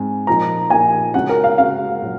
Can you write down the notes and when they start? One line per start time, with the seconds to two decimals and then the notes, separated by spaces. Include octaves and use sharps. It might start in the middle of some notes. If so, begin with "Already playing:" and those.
Already playing: G#2 C4 G#5
0.27 A#2 F3 A#3 D#4 A#5
0.70 A#2 F3 A#3 D#4 G#5
1.14 C#3 G#3 C#4 F#4 F#5
1.29 A#4
1.44 F5
1.58 C#3 G#3 C#4 F#4 F5
2.02 A#2 F#3